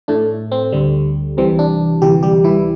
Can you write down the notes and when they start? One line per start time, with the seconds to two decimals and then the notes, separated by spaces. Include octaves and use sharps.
0.08 A2 A3 D4
0.52 C4
0.72 D2 D3 G3
1.37 C2 C3 E3 G3 C4
1.59 D4
2.01 D2 C3 E3 G3 G4
2.23 G3 G4
2.44 E3 E4